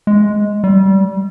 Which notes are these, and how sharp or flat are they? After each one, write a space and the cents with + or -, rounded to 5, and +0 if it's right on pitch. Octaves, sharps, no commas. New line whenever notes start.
G#3 +10
G3 -25